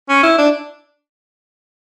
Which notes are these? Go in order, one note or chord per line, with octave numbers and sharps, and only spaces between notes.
C#4
E4
D4